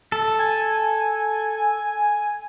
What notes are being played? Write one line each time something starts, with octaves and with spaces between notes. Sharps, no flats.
A4
G#5